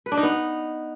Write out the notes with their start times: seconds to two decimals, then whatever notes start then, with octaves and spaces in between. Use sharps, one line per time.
0.06 B4
0.12 D4
0.17 D#4
0.23 B3